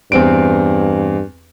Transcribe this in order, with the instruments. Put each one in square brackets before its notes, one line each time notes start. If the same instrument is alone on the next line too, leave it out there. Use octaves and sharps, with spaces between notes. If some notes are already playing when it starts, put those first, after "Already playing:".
[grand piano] E2 C4 D7 [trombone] G2